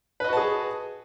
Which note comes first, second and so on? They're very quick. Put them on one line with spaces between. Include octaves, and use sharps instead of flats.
B4 D#5 F#4 A5 G#4